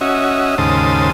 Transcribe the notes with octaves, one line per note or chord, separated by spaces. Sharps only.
C#4 F#4 D#5 E5
D#2 G#2 C#3 C5 A5 D#6